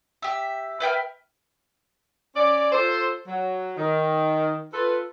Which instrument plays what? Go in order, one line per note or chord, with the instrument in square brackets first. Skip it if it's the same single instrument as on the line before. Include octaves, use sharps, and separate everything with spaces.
[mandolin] G4 E5
B4 E5 G5 F6
[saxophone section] C#4 D5
F4 A4 C5
F#3
D#3
F4 A4 B4